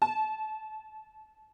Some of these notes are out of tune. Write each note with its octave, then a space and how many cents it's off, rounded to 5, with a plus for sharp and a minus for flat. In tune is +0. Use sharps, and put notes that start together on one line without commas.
A5 -30